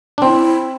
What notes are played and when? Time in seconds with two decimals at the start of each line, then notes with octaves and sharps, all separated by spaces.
0.18 D4
0.22 C4 E4